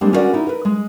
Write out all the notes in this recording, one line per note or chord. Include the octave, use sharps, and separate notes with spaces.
G3 G#3 A#3 C4 D4
C#4 E4 F#4 A#4 D5 F#5
D#4 E4
A#4 B4
G#3